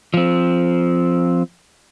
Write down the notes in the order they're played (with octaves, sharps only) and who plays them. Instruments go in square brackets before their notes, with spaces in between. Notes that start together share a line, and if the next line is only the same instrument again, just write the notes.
[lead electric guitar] F3 C4